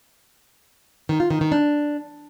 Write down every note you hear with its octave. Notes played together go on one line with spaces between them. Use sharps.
D#3
F4
D#3
D#3
D4